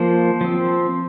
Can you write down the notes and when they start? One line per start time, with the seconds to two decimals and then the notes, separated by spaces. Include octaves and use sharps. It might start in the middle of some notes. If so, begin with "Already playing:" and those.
Already playing: F3 A#3 C5
0.41 F3 C4